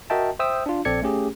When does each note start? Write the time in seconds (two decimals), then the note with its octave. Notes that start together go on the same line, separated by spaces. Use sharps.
0.10 F#4 A#4 D#5 E5 G5 A5
0.39 C5 E5 G5 D#6 E6
0.66 D4 F4
0.85 A#1 C4 A4 D5 G#6 C#7
1.02 A3 C#4 G4 G#4